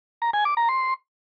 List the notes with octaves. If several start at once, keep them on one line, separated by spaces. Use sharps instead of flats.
A#5
G#5
D6
A#5
C6